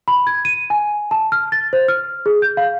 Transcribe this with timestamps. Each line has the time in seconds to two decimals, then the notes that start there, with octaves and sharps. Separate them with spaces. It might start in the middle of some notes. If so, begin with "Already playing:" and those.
0.08 B5
0.27 G#6
0.45 D#7
0.70 G#5
1.11 A5
1.32 F6
1.52 A6
1.73 C5
1.88 F6
2.26 G#4
2.42 G6
2.57 F5